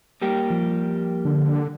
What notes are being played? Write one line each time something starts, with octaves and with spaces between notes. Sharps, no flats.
G3 A#3 G4
F3
D3